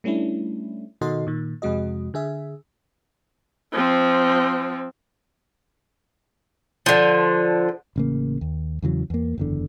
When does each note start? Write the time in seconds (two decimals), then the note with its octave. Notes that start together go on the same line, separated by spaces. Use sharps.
0.04 G3 A3 C#4 D4 E4
1.01 B2 D#3 F#4 A4 D#5 C6
1.27 A#2 D#3
1.62 F2 C3 G#3 F#4 D#5
2.14 D3 G#4 E5
3.73 F3 C4
6.86 D3 F3
7.96 A1 C#3 A#3
8.41 D#2
8.82 E2 C#3 E3 F#3
9.10 E2 A#3
9.38 F#1 E2 D3